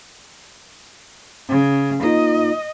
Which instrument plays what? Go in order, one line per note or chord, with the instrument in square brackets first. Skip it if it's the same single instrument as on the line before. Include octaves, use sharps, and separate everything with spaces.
[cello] C#3
[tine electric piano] A#3 D#4 F4 [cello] D#5